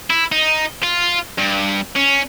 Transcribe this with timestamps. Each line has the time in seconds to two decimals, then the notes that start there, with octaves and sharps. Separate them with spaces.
0.10 E4
0.32 D#4
0.83 F4
1.38 G2
1.96 C#4